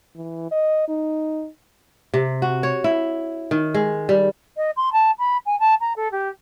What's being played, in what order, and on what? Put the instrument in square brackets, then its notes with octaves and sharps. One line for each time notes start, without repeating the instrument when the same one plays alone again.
[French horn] E3
D#5
D#4
[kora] C3
F#4
C#5
E4
D#3
G#3
G3
[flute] D#5
C6
A5
B5
G#5
A5
A#5
A4
G4